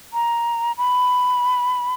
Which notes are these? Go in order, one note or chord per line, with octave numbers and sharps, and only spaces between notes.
A#5
B5